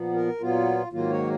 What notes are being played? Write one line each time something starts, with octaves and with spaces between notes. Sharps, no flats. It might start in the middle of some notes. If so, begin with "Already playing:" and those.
Already playing: A#2 F3 B3
A#4
A#2 F#3 B3 F4
G#2 D#3 F#3 A#3 F4
C#5